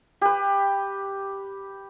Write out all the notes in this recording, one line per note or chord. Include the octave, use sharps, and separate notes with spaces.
G4 B4